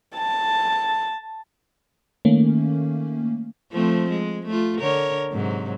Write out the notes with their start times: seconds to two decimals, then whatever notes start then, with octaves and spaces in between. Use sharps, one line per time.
0.15 A5
2.25 D#3 A3 A#3 C#4
3.72 F3 A3 C4
4.10 G#3
4.46 A3 F4
4.79 D3 A#4 C#5
5.32 G#2 C3 F#3